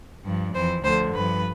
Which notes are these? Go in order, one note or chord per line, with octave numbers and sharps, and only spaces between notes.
G2 F3
F2 E3 C5
D2 D3 F3 C5
G2 F3 B4